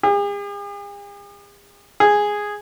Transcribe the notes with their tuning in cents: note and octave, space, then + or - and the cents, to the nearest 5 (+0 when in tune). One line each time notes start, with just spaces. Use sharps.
G#4 -45
G#4 -5